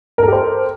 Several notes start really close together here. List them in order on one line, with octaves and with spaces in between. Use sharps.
A#4 A4 G4 C5